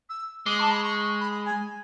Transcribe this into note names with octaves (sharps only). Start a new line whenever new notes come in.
E6
G#3 D6
A5
B5
C#6
B5
G#5